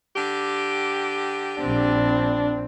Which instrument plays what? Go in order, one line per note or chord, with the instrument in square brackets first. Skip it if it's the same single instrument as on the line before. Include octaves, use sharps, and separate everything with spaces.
[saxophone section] D3 G4
[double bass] A#1 C4 [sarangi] D4